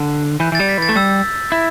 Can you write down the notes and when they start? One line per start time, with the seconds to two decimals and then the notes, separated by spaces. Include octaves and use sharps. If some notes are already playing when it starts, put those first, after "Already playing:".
Already playing: D3
0.40 E3 G6
0.52 E3
0.55 A6
0.59 G3
0.69 B6
0.78 E3 A6
0.89 A3
0.96 G3 E6
1.52 E4